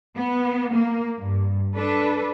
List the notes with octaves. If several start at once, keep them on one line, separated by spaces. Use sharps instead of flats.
B3
A#3
G2
D4 A4 B4